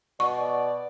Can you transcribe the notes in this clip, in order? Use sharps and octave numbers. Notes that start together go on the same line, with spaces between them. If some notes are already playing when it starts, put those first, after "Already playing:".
B2 D5 C#6